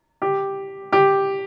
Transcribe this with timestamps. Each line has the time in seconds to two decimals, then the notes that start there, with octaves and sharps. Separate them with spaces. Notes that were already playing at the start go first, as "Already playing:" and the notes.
0.22 G4
0.92 G4